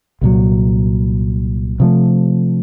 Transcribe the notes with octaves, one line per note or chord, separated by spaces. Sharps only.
C2 A#2 F#3
C3 F3 A3